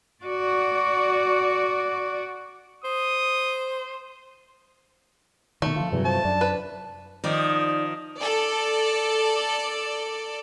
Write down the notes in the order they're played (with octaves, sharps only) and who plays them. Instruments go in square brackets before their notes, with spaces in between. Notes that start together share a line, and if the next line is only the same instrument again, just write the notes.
[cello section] F#4 D5
[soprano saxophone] C5 [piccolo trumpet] D#6
[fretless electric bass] B2 D#3 [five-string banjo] A3
[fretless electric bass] D3 F3 [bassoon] F4
[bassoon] E2 [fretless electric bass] G2 C3 F#3
[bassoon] F3 [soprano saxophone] A5
[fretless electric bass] F#2 [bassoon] D4
[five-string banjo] B4
[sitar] D#3 F3 [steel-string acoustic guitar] D#4 D5
[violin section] A4 D5